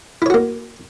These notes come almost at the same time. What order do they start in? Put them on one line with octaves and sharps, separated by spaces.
E4 C#5 F#4 A#3